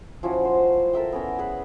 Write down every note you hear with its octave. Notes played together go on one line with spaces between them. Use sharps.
F3 C#4 E4 F#4
C5
A4 A#4 E5 G5
B3 C#4 A#4
G#4 B4